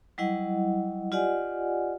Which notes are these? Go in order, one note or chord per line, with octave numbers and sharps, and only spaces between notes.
F#3 G3 E4 D#5 F#5
F4 G4 D5 D#5 F#5 G#5